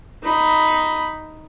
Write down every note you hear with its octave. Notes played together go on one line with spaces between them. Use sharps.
D#4 B5